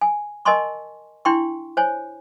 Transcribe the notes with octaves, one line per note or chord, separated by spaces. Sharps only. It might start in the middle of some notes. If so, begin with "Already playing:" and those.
G#5
A#4 D#5 G#5 A5 C6 C#6
D4 E4 G5 C6 C#6
C5 C#5 G#5